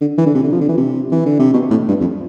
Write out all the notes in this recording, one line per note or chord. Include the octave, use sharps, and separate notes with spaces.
D3
E3
D3
C3
D3
F3
D3
E3
C3
E3
D3
C3
B2
A2
G2
F2